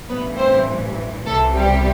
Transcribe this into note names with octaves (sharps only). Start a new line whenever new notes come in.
A1 G2 E3 B3 B4
C4 C5
C2 C3 E3 A3 A4
G3 G4